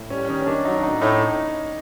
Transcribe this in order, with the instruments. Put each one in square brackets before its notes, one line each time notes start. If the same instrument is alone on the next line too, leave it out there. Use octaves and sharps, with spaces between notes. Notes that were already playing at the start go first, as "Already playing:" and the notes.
Already playing: [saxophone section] A2
[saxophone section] G3 [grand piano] C#4
[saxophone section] D#3 [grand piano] C#4
[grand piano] C#4
[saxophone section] D#3 [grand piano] D4
[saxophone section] F#3 [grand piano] D#4
[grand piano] D4
[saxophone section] A2 [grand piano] D#4
[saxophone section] A2 [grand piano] D#4